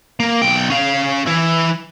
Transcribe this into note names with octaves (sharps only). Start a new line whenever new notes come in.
A#3
B1 G5
C#4 F5
E3 E4